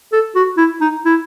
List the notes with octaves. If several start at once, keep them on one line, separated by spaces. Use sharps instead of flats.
A4
F#4
E4
D#4
E4